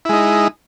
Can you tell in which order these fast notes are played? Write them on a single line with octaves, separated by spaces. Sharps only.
E4 G#3 D#4